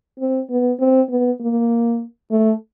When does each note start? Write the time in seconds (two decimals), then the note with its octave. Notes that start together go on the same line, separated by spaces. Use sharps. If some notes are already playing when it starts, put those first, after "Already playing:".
0.20 C4
0.50 B3
0.80 C4
1.10 B3
1.40 A#3
2.31 A3